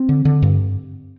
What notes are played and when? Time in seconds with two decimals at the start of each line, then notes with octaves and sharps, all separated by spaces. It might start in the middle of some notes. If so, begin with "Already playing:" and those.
Already playing: C4
0.09 D3
0.25 D3
0.42 G2